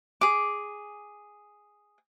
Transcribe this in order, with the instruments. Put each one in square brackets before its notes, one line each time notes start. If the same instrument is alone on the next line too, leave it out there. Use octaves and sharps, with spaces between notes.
[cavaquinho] G#4 D6